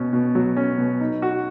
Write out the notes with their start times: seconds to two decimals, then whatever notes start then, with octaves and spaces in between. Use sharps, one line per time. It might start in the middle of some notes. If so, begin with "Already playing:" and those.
Already playing: B2 C#4
0.13 B2
0.35 F#3
0.57 C#4
0.78 B2
1.00 D#4
1.22 F#4